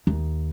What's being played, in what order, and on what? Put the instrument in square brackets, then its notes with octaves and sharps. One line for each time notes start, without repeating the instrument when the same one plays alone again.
[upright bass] D#2